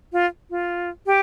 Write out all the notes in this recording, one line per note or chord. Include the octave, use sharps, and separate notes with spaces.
F4
F4
G4